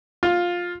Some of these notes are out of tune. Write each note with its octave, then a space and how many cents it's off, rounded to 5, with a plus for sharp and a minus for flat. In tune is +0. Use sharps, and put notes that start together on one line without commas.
F4 +10